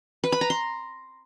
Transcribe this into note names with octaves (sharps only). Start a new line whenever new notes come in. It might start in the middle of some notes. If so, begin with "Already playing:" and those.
B4
B5
A#5
C6